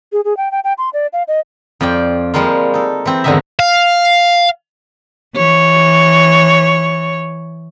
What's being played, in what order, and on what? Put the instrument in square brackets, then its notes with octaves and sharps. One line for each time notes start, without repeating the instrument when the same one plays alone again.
[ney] G#4
G#4
G5
G5
G5
C6
D5
F5
D#5
[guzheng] F2 F4 D5 G5
F3 G3 G#3 A#3 F4
D#4 A4
E3 C4
E2 G#2 D3 D#3 D#5 E5
[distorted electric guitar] F5
[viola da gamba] E3 C#5